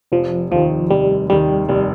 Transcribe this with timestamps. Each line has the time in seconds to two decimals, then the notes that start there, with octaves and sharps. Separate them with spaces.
0.12 F1 F3
0.51 D#2 D#3 F3
0.90 F1 G3
1.30 D#2 D#3 G3
1.69 F1 G3